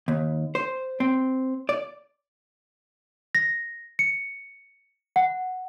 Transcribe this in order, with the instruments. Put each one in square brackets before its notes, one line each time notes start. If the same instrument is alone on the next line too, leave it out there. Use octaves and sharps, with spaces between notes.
[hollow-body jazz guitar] D#2
C5
C4
D5
[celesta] A#6
C#7
F#5